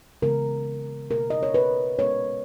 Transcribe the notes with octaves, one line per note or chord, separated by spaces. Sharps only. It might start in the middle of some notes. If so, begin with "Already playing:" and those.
C#3 E3 G#3 B3 A#4
B2 A#3 A#4
D#5
C#5
B4
A#2 G#3 B3 C#5